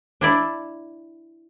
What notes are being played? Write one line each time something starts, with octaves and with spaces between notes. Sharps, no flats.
D4 E4 D5